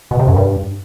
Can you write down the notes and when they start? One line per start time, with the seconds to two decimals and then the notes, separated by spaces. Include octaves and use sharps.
0.11 B2
0.19 C3
0.28 F#2
0.36 G2